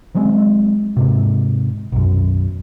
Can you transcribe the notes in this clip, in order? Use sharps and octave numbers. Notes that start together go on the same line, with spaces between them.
F3 F#3 G#3 C4
G#2 C3
B1 F#2